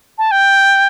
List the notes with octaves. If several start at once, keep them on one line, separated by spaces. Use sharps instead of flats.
A5
G5